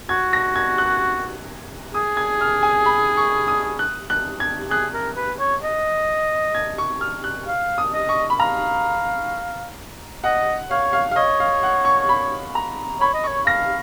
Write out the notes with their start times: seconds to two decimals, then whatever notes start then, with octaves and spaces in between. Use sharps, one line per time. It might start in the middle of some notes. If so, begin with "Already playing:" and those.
0.09 F#4 G#6
0.33 A#6
0.56 G#6
0.78 F#6
1.94 G#4 D#6
2.17 G#6
2.41 F6
2.63 G#5
2.86 B5
3.17 C#6
3.48 D#6
3.79 F#6
4.10 F#6
4.40 G#6
4.70 G#4 F#6
4.94 A#4
5.16 B4
5.39 C#5
5.63 D#5
6.55 G#6
6.78 C#6
7.01 F6
7.24 F#6
7.47 F5
7.78 D#6
7.93 D#5
8.09 C#6
8.30 B5
8.40 F5 A#5
10.24 D#5 F#5
10.71 C#5 F5
10.93 F5
11.11 F5
11.16 C#5 D#5
11.40 F5
11.63 F#5
11.85 C#6
12.09 B5
12.55 A#5
13.01 C#5 B5
13.14 D#5
13.24 C#5 C#6
13.46 F5 A#6